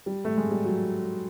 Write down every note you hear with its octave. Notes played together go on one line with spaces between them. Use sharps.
G3
A3
G#3
G3
F#3